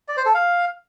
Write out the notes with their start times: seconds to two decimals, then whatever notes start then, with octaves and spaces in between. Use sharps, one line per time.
0.08 D5
0.17 C5
0.26 A4
0.34 F5